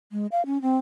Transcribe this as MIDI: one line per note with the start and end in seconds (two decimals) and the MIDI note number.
0.12 0.27 56
0.32 0.44 77
0.46 0.61 61
0.62 0.77 60